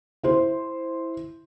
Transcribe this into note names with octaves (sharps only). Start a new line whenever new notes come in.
E4 C5